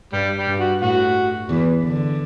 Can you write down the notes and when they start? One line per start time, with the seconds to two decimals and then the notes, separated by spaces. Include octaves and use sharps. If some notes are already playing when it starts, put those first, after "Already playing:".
0.13 G2 G3
0.36 G3
0.47 G2
0.59 F#4
0.82 A2 F#4
1.49 E2 E3
1.84 D3